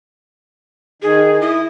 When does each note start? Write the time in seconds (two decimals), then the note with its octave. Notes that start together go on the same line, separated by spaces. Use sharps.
1.02 D#3 G#4
1.41 E4 D#6